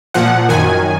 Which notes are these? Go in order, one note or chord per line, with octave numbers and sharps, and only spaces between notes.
A#2 F3 F#5
F#2 D#3 G#5